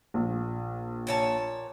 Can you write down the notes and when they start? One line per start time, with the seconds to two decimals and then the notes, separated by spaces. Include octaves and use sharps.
0.14 A#1
1.07 A#2 C#5 A5